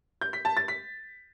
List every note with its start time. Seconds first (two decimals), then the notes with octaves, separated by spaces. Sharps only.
0.21 G6
0.33 B6
0.45 A5
0.57 A6
0.68 B6